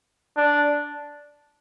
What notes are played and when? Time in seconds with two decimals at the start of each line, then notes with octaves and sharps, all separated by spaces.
0.37 D4